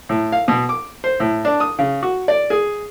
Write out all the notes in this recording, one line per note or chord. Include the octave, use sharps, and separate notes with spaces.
A2
F5
B2
D6
C5
A2
D4
D#6
C#3
F#4
D5
G#4